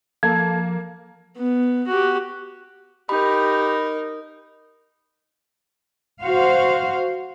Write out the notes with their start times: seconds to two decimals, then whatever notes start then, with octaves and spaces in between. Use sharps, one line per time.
0.23 F3 A#3 A4 G#6
1.36 B3
1.87 F#4 G4
3.09 D#4 G4 A#4 B5
6.23 F#4 C5 F5